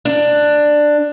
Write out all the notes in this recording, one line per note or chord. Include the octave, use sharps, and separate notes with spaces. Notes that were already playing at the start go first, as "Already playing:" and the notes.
D4